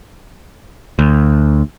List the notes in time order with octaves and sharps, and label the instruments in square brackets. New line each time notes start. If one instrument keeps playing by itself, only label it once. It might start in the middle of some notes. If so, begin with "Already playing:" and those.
[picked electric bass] D2